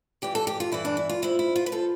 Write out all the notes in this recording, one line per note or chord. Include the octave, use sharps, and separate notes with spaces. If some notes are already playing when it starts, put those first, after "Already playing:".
G2 E3 G4
A4
G4
F4
G2 E3 E4
D4
E4
F4
G2 F3 E4
E4
F4
B4
F3 A4